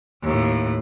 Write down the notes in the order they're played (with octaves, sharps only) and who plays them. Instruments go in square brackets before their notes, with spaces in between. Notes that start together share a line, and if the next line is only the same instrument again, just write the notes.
[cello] D#2 A2